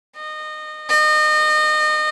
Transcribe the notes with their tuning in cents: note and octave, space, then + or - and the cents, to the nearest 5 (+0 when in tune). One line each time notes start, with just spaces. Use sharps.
D#5 -25
D#5 -30